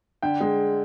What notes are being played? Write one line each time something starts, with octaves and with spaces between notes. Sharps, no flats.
D3 G5
G#3